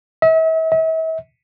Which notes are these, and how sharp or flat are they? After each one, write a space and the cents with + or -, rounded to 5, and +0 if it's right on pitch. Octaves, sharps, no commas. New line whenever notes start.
E5 -40
E5 -40